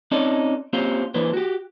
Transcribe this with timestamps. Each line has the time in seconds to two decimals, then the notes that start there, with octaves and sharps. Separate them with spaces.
0.11 C4 C#4 D#4 A4 C#5 D5
0.73 A#3 C4 C#4 F4 G4 C5
1.14 E3 A#3 D4 B4 C5
1.33 F#4 G4